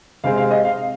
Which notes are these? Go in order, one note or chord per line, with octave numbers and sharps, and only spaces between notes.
C3 G#3 C4 F5
F5
D#5
F5